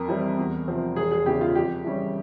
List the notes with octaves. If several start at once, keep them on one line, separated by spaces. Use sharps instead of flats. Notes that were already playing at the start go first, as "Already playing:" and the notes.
Already playing: F2 A#4
E3 G3 C4
E2
C3 F3 C4
E1 G#4
G#4
E2 C#3 E3 G4
F4
F2 G4
E3 G3 C#4